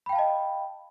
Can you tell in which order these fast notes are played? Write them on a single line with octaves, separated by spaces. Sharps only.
B5 G5 F5 A5 D#5